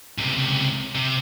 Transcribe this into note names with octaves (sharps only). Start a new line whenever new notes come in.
C#2 C3
C3